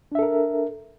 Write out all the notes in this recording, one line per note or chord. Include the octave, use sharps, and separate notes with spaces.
D4 A4 A#4 E5